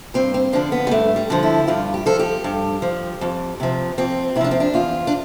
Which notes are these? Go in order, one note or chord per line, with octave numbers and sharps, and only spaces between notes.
G2 C4
C4
D3 F3 D4
B3
G3
G2 A3
G3
D3 F3
E4
G2 F4
G4
F3 A4
G4
G2
F3
F2
C3 F3
F2 C4
C3 F3 D4 E4
C4
D4
E2 F4
D4